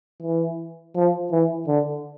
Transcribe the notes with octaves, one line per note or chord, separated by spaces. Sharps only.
E3
F3
E3
D3